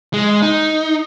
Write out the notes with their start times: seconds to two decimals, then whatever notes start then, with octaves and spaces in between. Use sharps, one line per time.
0.13 G#3
0.42 D#4